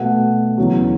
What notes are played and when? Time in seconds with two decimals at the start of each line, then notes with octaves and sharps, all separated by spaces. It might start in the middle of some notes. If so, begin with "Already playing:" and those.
Already playing: B2 A3 F#5
0.57 E2 C#3 F#3